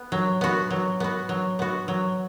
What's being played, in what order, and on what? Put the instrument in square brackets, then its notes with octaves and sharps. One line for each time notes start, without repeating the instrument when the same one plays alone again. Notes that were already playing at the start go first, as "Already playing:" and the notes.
Already playing: [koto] B3
F#3
B3 F#4
F#3
B3 F#4
F#3
B3 F#4
F#3